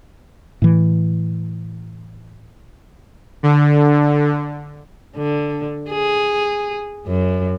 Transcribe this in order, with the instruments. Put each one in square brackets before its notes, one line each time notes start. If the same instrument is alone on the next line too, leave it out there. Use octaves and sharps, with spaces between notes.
[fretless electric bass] A2 E3
[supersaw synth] D3
[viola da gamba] D3
G#4
F#2